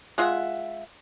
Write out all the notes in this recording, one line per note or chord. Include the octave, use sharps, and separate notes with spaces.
G#3 F4 E5 F#5